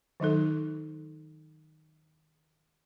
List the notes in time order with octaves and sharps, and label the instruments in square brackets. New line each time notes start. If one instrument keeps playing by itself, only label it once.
[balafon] D#3 F#3 D#4 A4